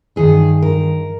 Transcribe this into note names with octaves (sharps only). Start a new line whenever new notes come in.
G2 D#3 G#4
A#4